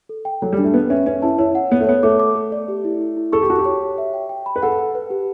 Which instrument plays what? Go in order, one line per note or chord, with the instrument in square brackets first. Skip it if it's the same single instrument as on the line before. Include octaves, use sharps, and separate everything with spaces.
[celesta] A4
G5
[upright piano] F#3 [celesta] A4
[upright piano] G3
[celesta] D4
[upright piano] A3
[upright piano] B3 [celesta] B4
[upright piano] C#4 [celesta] E5
[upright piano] C#4 [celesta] B4
[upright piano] E4 [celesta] A5
[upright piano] E4 [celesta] C#5
[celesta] F#5
[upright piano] B3 [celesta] C#5
[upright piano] A3
[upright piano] B3 [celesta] C#5
[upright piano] A3 [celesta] D6
[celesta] D6
A4
D5
G4
E4
E4
E4
[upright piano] A4 [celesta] C#6
[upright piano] G4
[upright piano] F#4 [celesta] A5
[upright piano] G4
[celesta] C#5
C#5
E5
G5
G5
B5
[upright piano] B4
[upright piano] A4 [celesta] F#5
[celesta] F#5
B4
G4